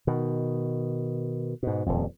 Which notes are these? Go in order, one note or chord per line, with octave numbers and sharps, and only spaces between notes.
B2 D#3
G#2 B2
D#1 F2